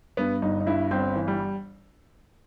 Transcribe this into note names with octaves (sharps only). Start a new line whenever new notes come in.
G2 B3
G1 D#4
D#4
G2 E4
G1 C4
E3
G3